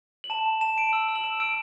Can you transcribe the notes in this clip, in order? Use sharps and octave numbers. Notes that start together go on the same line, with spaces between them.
F#7
A5 E7
A5
A5 E7
A5 D7
E6 F#7
E6
F#7
E6 E7
E6 D7